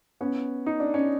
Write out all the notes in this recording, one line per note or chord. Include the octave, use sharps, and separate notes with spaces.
B3 C#4
D#4
D4
C#4